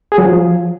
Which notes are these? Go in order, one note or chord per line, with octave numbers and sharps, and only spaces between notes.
G#4
F#3
F3